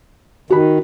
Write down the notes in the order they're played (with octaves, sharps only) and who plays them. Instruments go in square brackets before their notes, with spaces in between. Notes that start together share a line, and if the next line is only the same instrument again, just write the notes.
[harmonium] D#3 [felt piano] F#4 B5